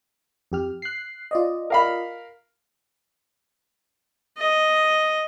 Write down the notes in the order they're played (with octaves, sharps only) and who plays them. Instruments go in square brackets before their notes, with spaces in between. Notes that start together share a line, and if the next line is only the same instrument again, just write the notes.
[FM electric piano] F2 G4 F6
F#6 C7
F4 D5 D#5
[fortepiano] A#4 F5 B5
[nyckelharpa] D#5